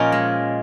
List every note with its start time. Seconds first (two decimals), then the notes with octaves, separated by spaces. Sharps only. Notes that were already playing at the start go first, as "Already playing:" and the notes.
Already playing: A#2 F3 C#4 F4 A#4 C#5 D#5
0.12 G#3